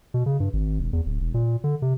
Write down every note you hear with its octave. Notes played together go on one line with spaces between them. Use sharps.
B2
C#3
G2
G#1
E1
E2
D1
E1
A#2
D3
C3